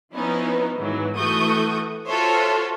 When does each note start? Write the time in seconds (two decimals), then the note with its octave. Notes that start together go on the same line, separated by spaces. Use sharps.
0.14 F3 B3 C#4 D#4 E4
0.78 G#2 D#3 E3 F#3
1.16 E3 A3 F#4 C#6 D#6 G6
2.09 F4 F#4 A4 C5 C#5 E5